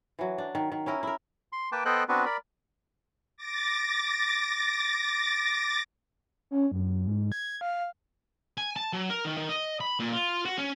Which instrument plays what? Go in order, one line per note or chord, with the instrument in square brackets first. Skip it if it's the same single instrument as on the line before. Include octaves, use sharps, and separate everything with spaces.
[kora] E3 F#3
D4
D#3
D#3
C#4 E4 A#4
E4 A#4
[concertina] C6
A#3 B4 G5 A5 D6
B3 A4 C5 D#5 G5 F#6
B3 C4 D4 F#4 B4
A#4 D5 B5
[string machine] D6 A6 A#6
[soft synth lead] C#4
F#2
G#2
G#6
F5
[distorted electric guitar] G#5
A5
F#3
A#4
D#3
D#3
D#5
B5
A#2
F4
F#4
C#4